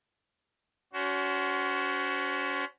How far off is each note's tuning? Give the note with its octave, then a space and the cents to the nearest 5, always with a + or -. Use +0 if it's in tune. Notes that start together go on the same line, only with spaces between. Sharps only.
C#4 +35 F#4 +20 C5 +0